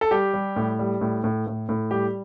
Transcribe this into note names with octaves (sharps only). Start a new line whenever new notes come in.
A4
G3 G4
G3
A2
G3
A2
A2
A2
A2
G3 G4